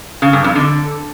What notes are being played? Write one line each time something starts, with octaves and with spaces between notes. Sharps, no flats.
C#3
G2
F2
D3